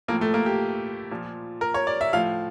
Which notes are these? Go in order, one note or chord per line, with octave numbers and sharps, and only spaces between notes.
A2 F3 A#3
A3
A#3
G4
A#2 F3
A#4
C#5
D5
E5
A2 F3 F5